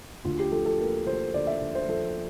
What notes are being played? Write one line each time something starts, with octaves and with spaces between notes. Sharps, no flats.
D2 F4
G4
F3 A4
A4
A#3 A#4
F3 C5
D3 D5
E5
D2
C5
F3 A4